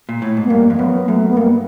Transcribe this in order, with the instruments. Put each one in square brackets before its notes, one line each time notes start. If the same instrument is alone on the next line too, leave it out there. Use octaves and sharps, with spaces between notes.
[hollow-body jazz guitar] A#2
A2
G#2
[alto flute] B3
[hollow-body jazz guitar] G2 [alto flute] A#3
[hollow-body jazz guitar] F2
[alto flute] A#3
[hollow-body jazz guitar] F#2 [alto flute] B3
[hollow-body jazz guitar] F#2 [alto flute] A3
[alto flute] B3
[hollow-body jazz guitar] G2 [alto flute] A#3